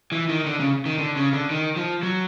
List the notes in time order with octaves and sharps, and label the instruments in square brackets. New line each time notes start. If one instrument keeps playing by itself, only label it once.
[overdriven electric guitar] E3
D#3
D3
C#3
D#3
D3
C#3
D3
D#3
F3
F#3